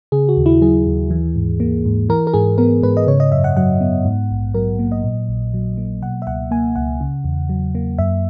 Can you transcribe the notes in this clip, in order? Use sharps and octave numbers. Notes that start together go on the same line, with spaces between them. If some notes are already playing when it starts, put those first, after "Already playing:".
C#3 G#4
F#4
D#2
E4
F#3 G#4
D#2
E3
G#2
A#3
G#2
E3 A#4
A#4
G#2 G#4
B3 A#4
G#2 B4
D#5
C#3 C#5
D#5
F#2 E5
F#5
F#3 F#5
B3
G#2
A#1
F#3 A#4
A#3
D#5
A#2
A#1
F#3
A#3
B2 F#5
E5
C#2 F#5
A#3 G#5
C#2 F#5
C#3
E2
F#3
A#3
F#2 E5